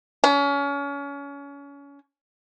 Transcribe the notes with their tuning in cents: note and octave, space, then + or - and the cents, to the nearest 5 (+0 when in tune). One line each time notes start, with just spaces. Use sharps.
C#4 +30